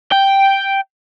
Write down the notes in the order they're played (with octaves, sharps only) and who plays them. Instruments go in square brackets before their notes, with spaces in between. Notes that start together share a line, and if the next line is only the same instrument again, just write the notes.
[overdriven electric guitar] G5